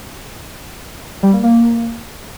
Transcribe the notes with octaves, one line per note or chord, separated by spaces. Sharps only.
G3
A#3
A#3